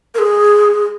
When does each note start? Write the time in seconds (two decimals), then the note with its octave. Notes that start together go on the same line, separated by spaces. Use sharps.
0.15 A#4
0.19 G#4